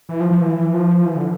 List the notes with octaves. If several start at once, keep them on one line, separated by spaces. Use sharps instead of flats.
E3
F3
F3
E3
F3
E3
D3